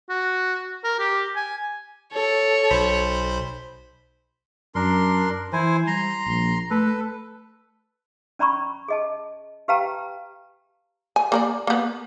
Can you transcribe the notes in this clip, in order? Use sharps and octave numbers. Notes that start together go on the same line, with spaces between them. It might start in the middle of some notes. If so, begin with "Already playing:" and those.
F#4
A#4
G4
G#5
A4 C#5
B1 C5 B5
F#2 D4 A#4 C6
E3 E4 C5 G#5
G3 A#5 C6
A#1
A3 A4 B4
C#4 D5 A#5 B5 C#6
G#4 D#5 A5
G4 B4 F5 G5 A5 A#5
G#5
A#3 A#4 D5
A#3 B3